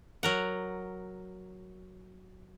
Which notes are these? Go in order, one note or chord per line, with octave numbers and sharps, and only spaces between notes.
F#3 A#4 F#5